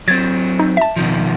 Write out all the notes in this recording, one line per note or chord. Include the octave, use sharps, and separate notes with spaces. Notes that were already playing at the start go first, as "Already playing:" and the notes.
F#3 C4 G#6 A6
D#4
E5 A5
B2 D#3 F3